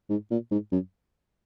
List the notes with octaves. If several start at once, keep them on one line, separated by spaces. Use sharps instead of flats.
G#2
A#2
G#2
F#2